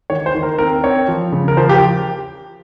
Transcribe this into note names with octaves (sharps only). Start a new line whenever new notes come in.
D#3 C#5
C5
D#3
A#4
C4 A#4
C4 C#5
F3
C#3
A#4
F3 C5
G4